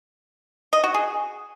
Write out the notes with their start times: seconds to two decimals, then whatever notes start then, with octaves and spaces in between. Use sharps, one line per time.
0.73 D#5
0.84 F#4
0.94 G#4